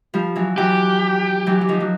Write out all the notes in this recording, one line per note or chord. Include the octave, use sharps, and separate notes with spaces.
F3 G3
E3 F#3
E3 F#3 G4
E3 F#3
F#3
D#3 F3
F#3